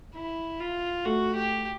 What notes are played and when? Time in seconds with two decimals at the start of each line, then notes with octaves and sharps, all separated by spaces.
0.15 E4
0.60 F4
1.05 A3 F#4
1.36 G4